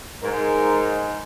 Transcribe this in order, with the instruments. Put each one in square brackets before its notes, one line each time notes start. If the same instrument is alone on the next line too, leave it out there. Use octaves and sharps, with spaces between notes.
[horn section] G#2 [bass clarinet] A#4